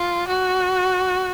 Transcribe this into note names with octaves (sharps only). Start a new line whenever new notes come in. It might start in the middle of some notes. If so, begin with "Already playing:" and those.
Already playing: F4
F#4